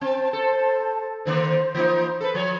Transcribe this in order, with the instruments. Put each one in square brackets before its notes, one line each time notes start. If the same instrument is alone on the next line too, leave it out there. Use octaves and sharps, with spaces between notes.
[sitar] C4 [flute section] C5 A5
[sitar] A4
[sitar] D3 D#3 A#3 [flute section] C5
[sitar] E3 A#3 D#4
A4 B4
F3 C#5